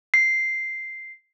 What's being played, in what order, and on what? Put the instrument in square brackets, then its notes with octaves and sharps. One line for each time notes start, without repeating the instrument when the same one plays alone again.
[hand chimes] C7